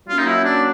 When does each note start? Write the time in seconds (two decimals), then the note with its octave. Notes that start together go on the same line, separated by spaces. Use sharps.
0.08 F#3 A#3 C#4 F4
0.19 D#4
0.26 E4
0.44 D4